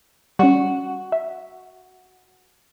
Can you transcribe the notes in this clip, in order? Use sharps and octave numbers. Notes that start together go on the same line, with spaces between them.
G3 C#4 F#4
E5